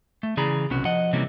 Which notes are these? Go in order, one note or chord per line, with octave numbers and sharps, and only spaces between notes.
A3
C#3 E3 G#4 D5 A#5 B5
B1 C3 B3 C#4 F#4 B4
F3 D#5 F#5
C3 E3 G3 A#3 C#4